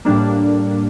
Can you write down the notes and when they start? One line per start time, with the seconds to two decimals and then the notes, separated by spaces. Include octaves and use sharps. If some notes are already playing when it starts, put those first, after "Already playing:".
0.05 A2 G3 A#3 D4